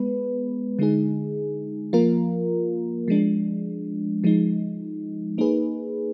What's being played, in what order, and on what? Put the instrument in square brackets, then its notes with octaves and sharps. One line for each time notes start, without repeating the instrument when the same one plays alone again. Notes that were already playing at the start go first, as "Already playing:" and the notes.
Already playing: [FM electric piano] G#3 B3 B4
D3 G#3 D#4 G#4
F3 A#3 F4 A#4
F3 G#3 D4
F3 G#3 D#4
A#3 D#4 G#4 B4